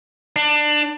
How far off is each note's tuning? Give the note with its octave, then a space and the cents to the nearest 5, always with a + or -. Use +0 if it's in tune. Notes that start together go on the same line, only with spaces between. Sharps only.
D4 +20